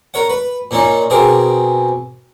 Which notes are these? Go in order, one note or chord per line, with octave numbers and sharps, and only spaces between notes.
A#4 C#5 F#5
B4
A#2 A#3 C#4 D#4
B2 C4 G#4 A#4 D6